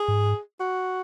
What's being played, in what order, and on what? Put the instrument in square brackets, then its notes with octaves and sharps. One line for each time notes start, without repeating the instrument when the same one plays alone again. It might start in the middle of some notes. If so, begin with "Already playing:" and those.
Already playing: [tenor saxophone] G#4
[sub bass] G#2
[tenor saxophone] F#4